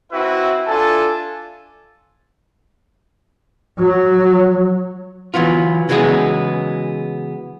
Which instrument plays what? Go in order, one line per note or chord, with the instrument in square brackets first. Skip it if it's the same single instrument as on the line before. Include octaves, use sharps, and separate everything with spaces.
[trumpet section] C4 E4 F#4 B4 E5
D4 F4 A4 E5 G#5 A5
[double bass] F#3
[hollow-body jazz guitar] E3 F#3 B3 F4
C#3 E3 F#3 G#3 B3 G#4